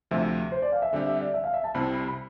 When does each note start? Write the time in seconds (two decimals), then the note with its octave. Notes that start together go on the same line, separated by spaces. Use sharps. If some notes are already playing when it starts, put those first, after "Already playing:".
0.11 D2 C3 F3 E5
0.52 C5
0.62 D5
0.72 F5
0.82 E5
0.93 D3 G3 C4 G4 E5
1.07 E5
1.20 D5
1.34 E5
1.44 F5
1.54 E5
1.64 A5
1.74 C2 C3 G3 C4 E4 B5
1.95 B5
2.07 B5